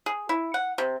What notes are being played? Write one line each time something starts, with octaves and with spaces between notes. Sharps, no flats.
G#4
E4
F#5
C3